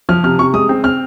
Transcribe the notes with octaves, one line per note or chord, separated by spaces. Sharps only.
F3 F6
C3 F6
C3 C#6
G#3 D#6
C4
C4 F6